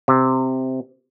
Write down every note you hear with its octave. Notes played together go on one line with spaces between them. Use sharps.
C3